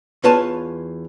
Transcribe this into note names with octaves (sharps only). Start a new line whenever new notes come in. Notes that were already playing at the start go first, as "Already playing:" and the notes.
E2 F4 B4 C#5 A5